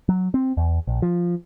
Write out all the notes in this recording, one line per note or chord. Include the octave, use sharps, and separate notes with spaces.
F#3
C4
E2
A#1
F3